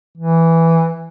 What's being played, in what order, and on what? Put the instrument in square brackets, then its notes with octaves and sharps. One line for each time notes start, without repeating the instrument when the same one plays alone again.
[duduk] E3